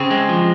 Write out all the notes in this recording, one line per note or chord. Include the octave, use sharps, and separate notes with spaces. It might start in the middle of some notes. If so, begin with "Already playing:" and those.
Already playing: C#3 C4
G#3
F3